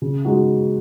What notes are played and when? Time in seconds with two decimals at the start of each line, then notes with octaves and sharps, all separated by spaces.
0.02 C#3
0.25 G#3 D#4 F#4